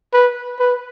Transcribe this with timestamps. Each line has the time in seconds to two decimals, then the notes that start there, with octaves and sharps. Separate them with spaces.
0.13 B4
0.59 B4